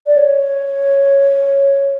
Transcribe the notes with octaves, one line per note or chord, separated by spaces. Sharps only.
D5
C#5